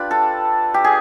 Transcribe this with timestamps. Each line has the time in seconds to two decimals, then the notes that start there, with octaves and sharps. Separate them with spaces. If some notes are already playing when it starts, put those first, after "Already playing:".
Already playing: D4 F4 G4 B4
0.11 A4
0.74 G4
0.84 G#4